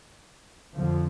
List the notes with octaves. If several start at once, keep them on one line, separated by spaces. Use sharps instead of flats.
F2 D3 F3